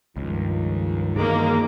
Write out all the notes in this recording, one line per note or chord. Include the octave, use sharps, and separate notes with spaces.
C#2 G2 D#3 F3
G2 D#3 E3 G#3 A#3 A#5 D6